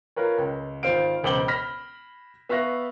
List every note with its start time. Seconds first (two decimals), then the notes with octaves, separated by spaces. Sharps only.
0.16 F4 A#4 B4 C#5
0.38 C#2
0.83 G#1 F4 C5 F5 D7
1.23 E1 C#2 C5 D6 F#7 G7
1.48 B5 F6 A#6 B6
2.49 B3 E5 F5 C#6 F#6 A#6